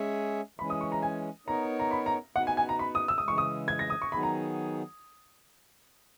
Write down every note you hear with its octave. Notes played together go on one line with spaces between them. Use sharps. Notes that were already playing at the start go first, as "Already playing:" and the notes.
Already playing: G#3 C#4 G#4 C#5 E5
E3 G#3 C#4 B5
D#6
C#6
A#5
G#5
B3 D#4 A#4 C#5 A#5
A#5
B5
A#5
B3 D#4 F#4 B4 F#5
G#5
G#5
A#5
B5
D#6
E6
D#6
C#3 E3 G#3 C#6
D#6
G#6
A#6
D#6
C#6
D#3 F#3 B3 D#4 G#4 B5
A#5